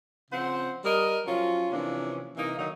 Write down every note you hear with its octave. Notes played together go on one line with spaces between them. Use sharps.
C#3 F3 C4 C5 F#5
G3 A#4 D#5
F3 F#3 C#4 F4
C3 E3 F3 A#3 C#4 D4
C3 E3 A#3 D#4
D3 D#3 F#3 D#4